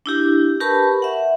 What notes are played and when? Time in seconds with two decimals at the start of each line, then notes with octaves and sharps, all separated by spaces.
0.06 D4 E4 G4
0.60 G4 A#4 B4 A5 B5 C#6
1.02 E5 F#5